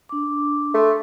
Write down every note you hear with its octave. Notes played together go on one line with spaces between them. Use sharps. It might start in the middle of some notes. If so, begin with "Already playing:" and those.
D4 D6
A3 C6